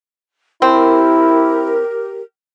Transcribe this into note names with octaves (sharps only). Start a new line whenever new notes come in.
C4 E4 G4 A#4